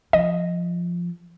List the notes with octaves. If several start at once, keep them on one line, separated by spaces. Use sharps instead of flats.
F3 D#5